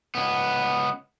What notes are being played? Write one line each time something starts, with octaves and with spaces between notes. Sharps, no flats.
C#2 B3